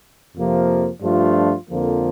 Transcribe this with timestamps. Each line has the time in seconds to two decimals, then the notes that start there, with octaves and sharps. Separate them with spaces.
0.36 F2 C3 F3 A#3
1.02 G2 F3 A3 D4 F4
1.68 F2 D3 F3 A#3